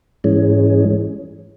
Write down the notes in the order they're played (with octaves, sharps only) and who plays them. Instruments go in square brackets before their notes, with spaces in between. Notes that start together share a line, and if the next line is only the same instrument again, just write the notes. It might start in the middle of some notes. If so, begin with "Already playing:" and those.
[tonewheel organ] G#2 E3 G#3 C#4